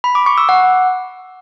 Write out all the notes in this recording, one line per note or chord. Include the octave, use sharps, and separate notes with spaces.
B5
D6
C#6
E6
F#5